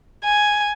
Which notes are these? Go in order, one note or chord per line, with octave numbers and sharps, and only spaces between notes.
G#5